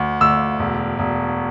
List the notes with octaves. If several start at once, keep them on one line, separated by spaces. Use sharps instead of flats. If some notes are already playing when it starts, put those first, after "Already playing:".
Already playing: D2
D2 E6
E1
E1